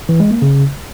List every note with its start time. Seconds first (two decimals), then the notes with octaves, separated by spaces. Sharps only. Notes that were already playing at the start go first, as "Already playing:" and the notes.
0.09 E3
0.20 G#3
0.31 A#3
0.42 C#3